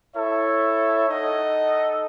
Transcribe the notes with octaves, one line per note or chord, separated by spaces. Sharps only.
E4 A4 C#5 E5
D#4 A4 D#5 F#5